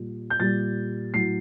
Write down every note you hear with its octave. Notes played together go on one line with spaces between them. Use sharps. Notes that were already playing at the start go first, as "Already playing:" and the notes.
Already playing: A#2 G3
G6
A#2 G3 A6
A2 F#3 C7